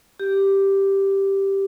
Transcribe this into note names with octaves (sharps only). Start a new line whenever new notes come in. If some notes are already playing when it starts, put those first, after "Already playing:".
G4